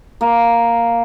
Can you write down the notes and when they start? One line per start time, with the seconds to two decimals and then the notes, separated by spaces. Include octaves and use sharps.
0.21 A#3